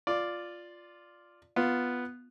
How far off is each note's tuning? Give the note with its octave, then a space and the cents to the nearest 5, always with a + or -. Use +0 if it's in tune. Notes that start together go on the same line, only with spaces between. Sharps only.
F4 +0 D5 +0
B3 +0 F4 +0